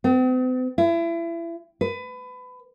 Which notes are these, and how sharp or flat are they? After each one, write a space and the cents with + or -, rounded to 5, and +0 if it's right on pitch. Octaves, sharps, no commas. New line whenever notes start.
C4 -45
E4 +30
B4 +25